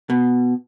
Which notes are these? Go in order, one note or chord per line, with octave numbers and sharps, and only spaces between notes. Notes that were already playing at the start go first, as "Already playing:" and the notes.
B2